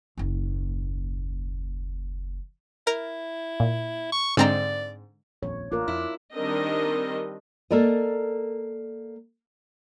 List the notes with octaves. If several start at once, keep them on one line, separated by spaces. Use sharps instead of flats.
F#1 D#2
E4 A#4
A#2
C#6
G#2 D3 G#3 C4 D5 A#5
D#1 A#1 F2 C#5
A1 A#3 D4 F4 A#4
F2 E4
D#3 G3 C4 D4 A#4 D#5
A#3 A4 A#4 D5 D#5